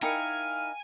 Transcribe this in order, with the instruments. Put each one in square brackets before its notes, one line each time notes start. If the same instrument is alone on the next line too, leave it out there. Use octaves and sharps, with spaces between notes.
[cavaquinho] D#4 E4 A#4 [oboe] F5 [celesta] G5 A#5 C#7 [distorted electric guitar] G#5